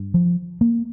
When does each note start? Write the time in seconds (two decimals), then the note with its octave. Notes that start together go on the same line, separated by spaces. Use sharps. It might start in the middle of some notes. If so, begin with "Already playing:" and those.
Already playing: G2
0.14 F3
0.61 A#3